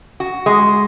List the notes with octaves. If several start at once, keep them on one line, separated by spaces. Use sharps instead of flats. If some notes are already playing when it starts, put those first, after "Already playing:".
F#4
G#3